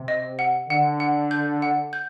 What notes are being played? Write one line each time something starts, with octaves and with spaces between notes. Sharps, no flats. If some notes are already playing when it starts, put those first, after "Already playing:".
Already playing: C3
D#5
F#5
D3 F#5
F#5
G6
F#5
G6